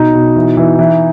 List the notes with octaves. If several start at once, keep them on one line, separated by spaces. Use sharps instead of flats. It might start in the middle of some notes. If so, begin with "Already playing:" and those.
Already playing: B2 D#4
B2
E3
E3
E3